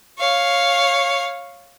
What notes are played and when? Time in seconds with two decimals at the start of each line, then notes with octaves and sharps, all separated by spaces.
0.18 C#5 F5